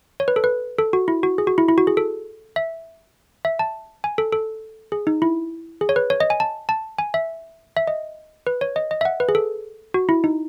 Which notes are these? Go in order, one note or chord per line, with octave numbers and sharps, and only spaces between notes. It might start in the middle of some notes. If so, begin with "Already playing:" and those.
C#5
B4
A4
B4
A4
F#4
E4
F#4
G#4
F#4
E4
E4
F#4
G#4
A4
E5
E5
A5
G#5
A4
A4
G#4
D#4
E4
G#4
C#5
B4
C#5
D#5
G#5
A5
A5
G#5
E5
E5
D#5
B4
C#5
D#5
D#5
E5
F#5
B4
G#4
A4
F#4
E4
D#4